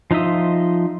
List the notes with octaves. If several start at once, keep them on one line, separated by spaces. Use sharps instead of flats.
F3 D#4 F4 E5 D#6